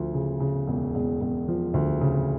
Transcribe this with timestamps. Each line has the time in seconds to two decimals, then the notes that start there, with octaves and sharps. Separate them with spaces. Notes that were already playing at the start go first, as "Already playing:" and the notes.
Already playing: D2 F3
0.14 C#3
0.40 C#3
0.68 E1
0.95 E1
1.21 E1
1.48 F3
1.74 D2
2.01 C#3